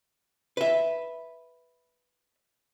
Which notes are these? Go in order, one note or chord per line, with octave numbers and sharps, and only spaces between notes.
B4 E5